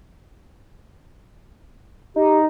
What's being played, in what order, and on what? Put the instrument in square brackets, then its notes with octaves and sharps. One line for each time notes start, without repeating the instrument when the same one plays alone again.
[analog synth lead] D#4 [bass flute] G4